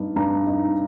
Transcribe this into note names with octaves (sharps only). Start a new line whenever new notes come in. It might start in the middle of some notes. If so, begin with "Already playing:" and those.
Already playing: G2 D#4
G2 A#5
D#4